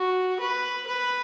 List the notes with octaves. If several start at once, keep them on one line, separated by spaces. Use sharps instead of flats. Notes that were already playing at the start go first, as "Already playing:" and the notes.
Already playing: F#4
B4
B4